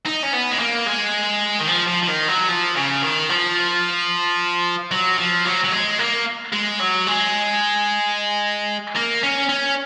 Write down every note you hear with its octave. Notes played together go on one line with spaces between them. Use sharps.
D#4
C#4
B3
G#3
A#3
G#3
D#3
F3
F3
F3
D#3
F#3
F3
C#3
D#3
F3
F#3
F3
F#3
F#3
G#3
A#3
G#3
F#3
G#3
A#3
C#4
C#4